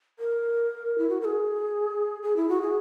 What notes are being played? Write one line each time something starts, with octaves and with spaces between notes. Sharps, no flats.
A#4
E4
F#4
A#4
G#4
G#4
E4
F#4
G#4